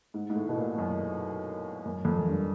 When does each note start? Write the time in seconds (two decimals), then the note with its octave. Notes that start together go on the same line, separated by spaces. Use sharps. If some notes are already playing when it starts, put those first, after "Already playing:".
0.14 G#2
0.30 G#2
0.35 A2
0.49 B2
0.57 A#2
0.78 F#2
1.85 F#2
2.05 F2
2.16 F#2
2.28 G2